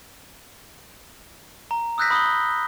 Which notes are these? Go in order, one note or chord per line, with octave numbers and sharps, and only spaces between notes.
A#5
D#6 E6 F#6 G6 A#6 B6
B5 D#6 A#6 G7